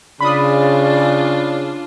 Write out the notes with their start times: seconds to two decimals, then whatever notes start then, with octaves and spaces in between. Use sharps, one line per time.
0.21 C#3 D4 F4 D5 B5 D#6